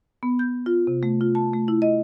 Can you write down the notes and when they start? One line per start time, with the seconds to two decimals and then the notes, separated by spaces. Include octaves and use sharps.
0.23 B3
0.39 G6
0.66 F4
0.87 C3
1.03 A3
1.21 F4
1.35 A5
1.53 A3
1.68 E4
1.82 D#5